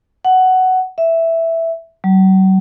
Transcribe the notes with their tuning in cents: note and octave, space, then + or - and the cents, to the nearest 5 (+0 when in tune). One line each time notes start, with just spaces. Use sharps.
F#5 +10
E5 +0
F#3 +45